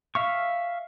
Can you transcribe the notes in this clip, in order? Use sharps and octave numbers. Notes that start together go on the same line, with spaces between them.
E5 F5 C#6